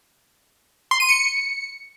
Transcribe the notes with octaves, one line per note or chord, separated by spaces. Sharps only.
C6
D#7
C#7